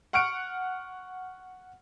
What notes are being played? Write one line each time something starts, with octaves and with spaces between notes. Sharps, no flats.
F#5 C#6 F6 C#7 D7